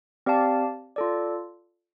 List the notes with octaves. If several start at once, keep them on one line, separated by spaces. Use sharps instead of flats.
C4 G4 D5 F5 A5
F4 A4 D5